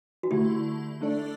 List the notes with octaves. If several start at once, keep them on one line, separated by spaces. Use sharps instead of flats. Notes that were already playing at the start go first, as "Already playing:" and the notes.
F#4
D3 A3 E4 G4
A3 D4 A4 D5